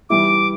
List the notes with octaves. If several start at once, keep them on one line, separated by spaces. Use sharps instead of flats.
E3 G3 E4 D6